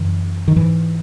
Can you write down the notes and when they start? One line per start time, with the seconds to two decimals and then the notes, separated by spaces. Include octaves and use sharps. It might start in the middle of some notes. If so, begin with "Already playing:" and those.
Already playing: F#2 C#3 E3
0.48 D#3
0.56 G#2 E3